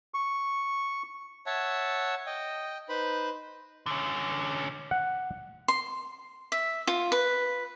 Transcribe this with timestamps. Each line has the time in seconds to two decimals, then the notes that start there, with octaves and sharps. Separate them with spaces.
0.14 C#6
1.46 C#5 E5 F#5 A5
2.27 D#5 G5
2.89 D#4 B4 C5 B5
3.86 D3 C#4
4.91 F#5
5.68 C6
6.52 E5
6.87 F4
7.12 B4